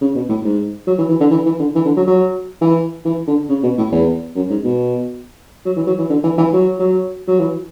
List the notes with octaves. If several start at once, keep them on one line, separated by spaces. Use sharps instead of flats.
C#3
B2
A2
G#2
F#3
E3
E3
D3
E3
E3
D3
E3
D3
F#3
F#3
E3
E3
D3
C#3
B2
A2
E2
F#2
G#2
B2
F#3
E3
F#3
E3
D3
E3
E3
F#3
F#3
F#3
E3